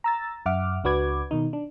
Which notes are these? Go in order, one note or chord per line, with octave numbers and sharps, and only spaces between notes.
A#5 E6 A6
F#2 E5 F#5 D6 F6
C#2 D4 F#4 B4 D6 G#6
B2 D#3 D#4
D4